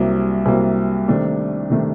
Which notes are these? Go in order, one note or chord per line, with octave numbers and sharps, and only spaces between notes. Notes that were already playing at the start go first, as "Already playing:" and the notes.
Already playing: C2 C3 F#3 A#3
C2 C3 F#3 A#3
C3 D#3 A3 D4
C3 D#3 A3 D4